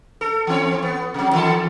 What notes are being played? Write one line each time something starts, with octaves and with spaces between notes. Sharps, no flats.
A4
E3 C4 C#5
B3
C3 F#3
D#3 E3 A4